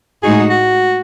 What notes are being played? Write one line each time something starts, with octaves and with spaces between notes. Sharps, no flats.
A2 G#3 D#4 F#4 G#4
F#4